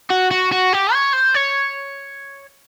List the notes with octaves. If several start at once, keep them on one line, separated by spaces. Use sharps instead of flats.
F#4
F#4
F#4
G4
C#5
C5
C#5